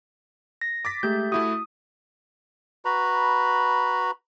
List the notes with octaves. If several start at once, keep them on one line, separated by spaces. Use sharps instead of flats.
A#6
D6 A6 B6
G#3 A3 G4 G6
A3 E4 F#4 D#6
F#4 B4 A#5 B5